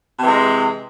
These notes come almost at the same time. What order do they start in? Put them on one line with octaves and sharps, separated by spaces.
C3 E3 G#3